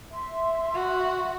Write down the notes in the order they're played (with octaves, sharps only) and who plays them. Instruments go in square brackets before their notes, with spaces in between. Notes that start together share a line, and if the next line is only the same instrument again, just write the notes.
[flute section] E5 C6
[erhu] F#4